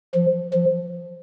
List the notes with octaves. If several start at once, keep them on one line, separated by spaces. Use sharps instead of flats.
F3
F3